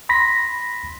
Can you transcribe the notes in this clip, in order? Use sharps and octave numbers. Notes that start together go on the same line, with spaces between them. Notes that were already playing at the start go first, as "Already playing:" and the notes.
B5 C6 A#6 B6